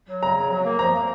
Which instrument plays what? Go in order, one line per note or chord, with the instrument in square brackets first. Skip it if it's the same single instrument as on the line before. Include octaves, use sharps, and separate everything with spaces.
[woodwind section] F#3
[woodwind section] C#3 [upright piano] A#5
[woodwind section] F#3
F#3
A#3
[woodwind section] F3 [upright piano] A#5
[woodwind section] A#3